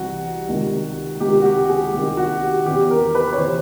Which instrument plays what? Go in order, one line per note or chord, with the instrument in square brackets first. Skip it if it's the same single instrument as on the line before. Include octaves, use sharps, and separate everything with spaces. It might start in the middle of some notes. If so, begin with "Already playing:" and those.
Already playing: [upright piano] C2 C3 E3 F#4
C#2 C3 D#3
C#2 C3 D#3 G4
F#4
G4
G#4
C2 C3 D#3 G4
F#4
G4
E2 C#3 E3 G4
A#4
B4
C#5
C3 E3 C5